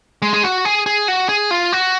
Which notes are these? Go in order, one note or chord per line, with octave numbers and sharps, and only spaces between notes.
G#3
G#4
F#4
G#4
G#4
F#4
G#4
F4
F#4